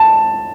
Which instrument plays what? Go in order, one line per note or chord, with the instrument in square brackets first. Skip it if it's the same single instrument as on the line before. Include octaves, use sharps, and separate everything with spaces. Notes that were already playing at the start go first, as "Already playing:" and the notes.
Already playing: [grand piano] A5